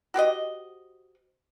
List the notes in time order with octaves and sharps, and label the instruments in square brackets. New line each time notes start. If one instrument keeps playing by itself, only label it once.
[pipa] F#4 G4 C5 D#5